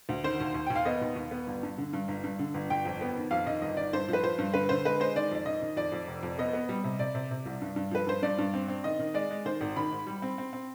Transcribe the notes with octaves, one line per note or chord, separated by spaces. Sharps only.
D2
D#3 C5
D#2
D#2
D#2 G5
F5
B3 D#5
D#2
D#2
B3
G1
G2
D3
G2
G1
G2
D3
G1
G1 G5
F2
B3
D#3
F2 F5
D#3 D#5
G1 D#5
D#3 D5
G2 C5
F3 B4
F3 C5
G2
D3 B4
D3 C5
G#3 B4
G#3 C5
D#3 D5
F2 D5
D#3 D#5
D#3
F2 D5
F2
F1
F2
B3 D#5
B3
G3
C3
C3 D5
C3
C3
C2
G2
G2
F3 B4
G2 C5
G2 D5
G2
C4
C4
D#3 D#5
D#3
G#3 D5
G#3
D#3 C5
G#1
D#3 B5
G#2
G3
C4
C4
C4